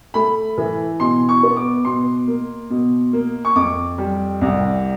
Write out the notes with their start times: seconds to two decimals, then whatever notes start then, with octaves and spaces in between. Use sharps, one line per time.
0.14 A3 B5
0.58 E3
1.00 B2 C6
1.29 C#6
1.43 B3
1.57 D6
1.85 B2 C6
2.27 A#3
2.70 B2
3.13 A#3
3.45 C#6
3.55 F2 D6
3.98 G3
4.41 C2